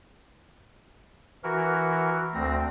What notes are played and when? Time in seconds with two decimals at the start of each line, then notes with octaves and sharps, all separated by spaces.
1.44 E3 F#4 A#4
2.35 D2 C4 A#6